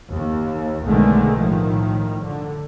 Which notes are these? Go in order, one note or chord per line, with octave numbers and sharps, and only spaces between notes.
D#2
B1 D3 D#3 G#3 A3
A2 D#3 F3
D3